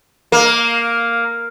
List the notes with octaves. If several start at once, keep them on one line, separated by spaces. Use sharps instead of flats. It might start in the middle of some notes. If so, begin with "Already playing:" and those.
A#3